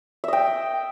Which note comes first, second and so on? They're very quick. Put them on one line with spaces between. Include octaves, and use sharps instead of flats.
E5 D#5 G5